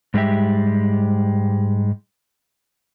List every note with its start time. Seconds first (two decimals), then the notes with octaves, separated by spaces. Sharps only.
0.14 G#2 G3 G#3 G4 E5